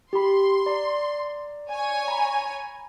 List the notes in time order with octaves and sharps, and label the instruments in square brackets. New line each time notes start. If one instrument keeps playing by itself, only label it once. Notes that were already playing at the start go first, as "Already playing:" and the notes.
[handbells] G4 B5 [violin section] C6
[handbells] D5 A#5
[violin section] C#5 G#5
[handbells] A#5 B5